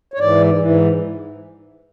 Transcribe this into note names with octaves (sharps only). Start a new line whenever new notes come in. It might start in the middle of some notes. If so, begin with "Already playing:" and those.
C#5
G#2 E3 D5
G#2 E3